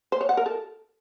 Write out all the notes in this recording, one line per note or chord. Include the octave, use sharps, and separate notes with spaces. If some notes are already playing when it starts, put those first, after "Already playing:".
C5
C#5
F#5
A#4
A4